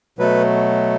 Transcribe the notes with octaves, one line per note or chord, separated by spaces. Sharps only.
B2 F#3 A3 B4